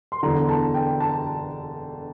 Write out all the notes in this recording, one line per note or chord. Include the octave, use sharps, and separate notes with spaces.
C6
E1 E2 D3 A#5
A5
G5
A5